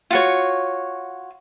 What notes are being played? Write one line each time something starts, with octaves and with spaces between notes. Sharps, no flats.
F4 F#4 C#5